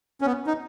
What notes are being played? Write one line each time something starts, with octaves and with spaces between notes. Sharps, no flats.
C#4
B3
D#4